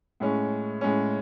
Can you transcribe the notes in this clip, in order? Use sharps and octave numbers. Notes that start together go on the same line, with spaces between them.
A2 G#3 C#4
A2 G#3 C#4